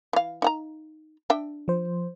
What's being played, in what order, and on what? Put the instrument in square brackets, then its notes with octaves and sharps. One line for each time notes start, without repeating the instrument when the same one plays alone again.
[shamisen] E3 F5
D#4 F#5 A#5
D4 E5 G5
[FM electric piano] F3 C5